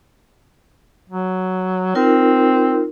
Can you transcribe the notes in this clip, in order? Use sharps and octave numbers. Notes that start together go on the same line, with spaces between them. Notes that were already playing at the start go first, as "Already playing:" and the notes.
F#3
C4 D#4 F4 A#4